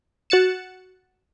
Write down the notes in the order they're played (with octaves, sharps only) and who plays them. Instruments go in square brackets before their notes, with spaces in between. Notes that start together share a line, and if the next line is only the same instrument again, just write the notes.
[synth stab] F#4 F#6 A6 C#7 E7